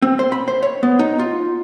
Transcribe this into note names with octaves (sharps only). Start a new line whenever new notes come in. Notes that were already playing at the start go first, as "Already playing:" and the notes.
C4
C5
B5
C5
C#5
B3
D#4
F4